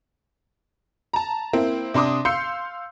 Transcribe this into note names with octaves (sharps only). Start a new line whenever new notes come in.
A5 A#5
A#3 C4 E4
C3 D4 C6 D6 D#6
F5 C6 E6 G6 C7 C#7